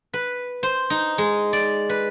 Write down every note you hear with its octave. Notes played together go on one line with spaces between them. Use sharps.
B4
C5
D#4
G#3
D5
B4